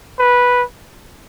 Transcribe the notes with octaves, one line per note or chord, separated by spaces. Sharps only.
B4